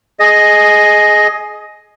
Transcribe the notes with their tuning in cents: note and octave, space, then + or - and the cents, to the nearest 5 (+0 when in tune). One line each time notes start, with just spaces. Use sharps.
G#4 +15 D#5 +0